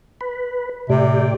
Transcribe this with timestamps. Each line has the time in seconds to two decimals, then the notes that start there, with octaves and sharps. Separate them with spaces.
0.21 B4
0.90 A2 C3 G4 D5